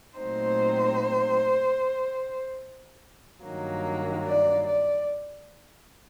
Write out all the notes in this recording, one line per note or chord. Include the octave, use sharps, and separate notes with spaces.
A#2 F#3 A3 C4 D#4 C5
G2 D#3 F#3 A#3
D5
D5